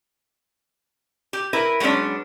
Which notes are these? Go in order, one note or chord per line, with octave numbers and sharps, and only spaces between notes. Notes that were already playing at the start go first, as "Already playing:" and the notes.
G4
E4 A#4 B4
F#3 G#3 B3 C#4 D4